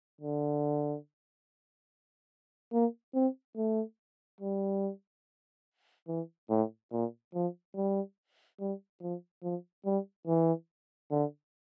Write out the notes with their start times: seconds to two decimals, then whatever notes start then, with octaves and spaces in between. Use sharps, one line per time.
0.21 D3
2.73 A#3
3.14 C4
3.56 A3
4.40 G3
6.08 E3
6.50 A2
6.92 A#2
7.34 F3
7.75 G3
8.60 G3
9.01 F3
9.43 F3
9.85 G3
10.27 E3
11.11 D3